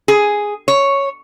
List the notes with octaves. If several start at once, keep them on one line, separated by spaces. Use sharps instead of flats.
G#4
C#5